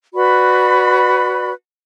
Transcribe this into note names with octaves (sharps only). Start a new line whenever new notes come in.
F#4 B4 D5 B5